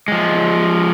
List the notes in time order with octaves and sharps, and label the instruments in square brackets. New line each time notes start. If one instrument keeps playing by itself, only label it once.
[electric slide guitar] F3 G#3